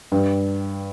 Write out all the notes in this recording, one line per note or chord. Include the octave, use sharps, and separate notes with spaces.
G2